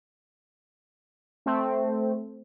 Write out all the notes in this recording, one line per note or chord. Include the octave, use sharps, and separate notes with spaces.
A3 C4